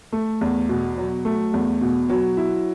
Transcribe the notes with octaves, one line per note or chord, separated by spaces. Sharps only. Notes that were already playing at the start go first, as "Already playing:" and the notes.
A3
E2
B2
F#3
A3
E2
B2
F#3
E4